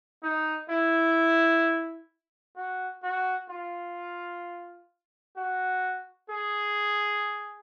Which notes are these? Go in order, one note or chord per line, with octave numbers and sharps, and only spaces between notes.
D#4
E4
F#4
F#4
F4
F#4
G#4